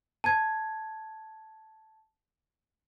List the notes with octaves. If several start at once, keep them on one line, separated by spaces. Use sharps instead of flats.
A5 G#6